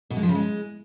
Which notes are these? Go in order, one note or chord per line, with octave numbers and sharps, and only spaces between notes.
B2
G#3
F3
C#3
G#3